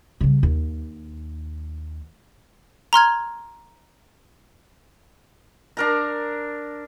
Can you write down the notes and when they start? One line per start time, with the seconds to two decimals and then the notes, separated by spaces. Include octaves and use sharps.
0.21 C#3 G3
0.43 D#2
2.93 A#5 C6 F6 G#6
5.77 D4 A#4 A#5